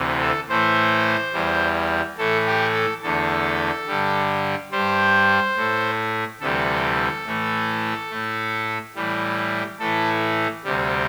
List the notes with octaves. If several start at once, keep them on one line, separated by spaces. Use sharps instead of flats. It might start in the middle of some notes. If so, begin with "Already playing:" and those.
Already playing: D2 C3 E3
A4
A2 E3 A3 C5
E2 E3 G3
A2 E3 A3 A4
G4
A4
E2 D3 A3 A4
G2 D3 G3
G2 G3 C5
A2 A3
D2 C3 E3 G3 A4
A2 E3 A3
A2 A3
A2 E3 G3
A2 E3 A3 A4
D2 C3 G3